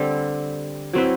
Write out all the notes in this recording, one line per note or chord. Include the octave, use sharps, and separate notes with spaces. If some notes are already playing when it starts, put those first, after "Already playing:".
Already playing: D3 G3 C4 G4
F#3 C4 E4 B4